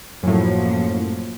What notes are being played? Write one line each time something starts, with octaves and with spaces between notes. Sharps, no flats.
F#2 A2 F3 F#3 A#3